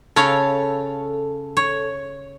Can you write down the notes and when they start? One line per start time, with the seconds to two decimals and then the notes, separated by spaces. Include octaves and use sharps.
0.16 C#3 A4 C#5 F5
1.57 C#5